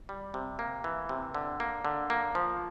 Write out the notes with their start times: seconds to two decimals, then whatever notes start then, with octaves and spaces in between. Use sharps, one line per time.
0.09 G3
0.34 C3
0.59 A#3
0.84 E3
1.09 C3
1.34 D3
1.60 A#3
1.85 D3
2.10 A#3
2.35 F3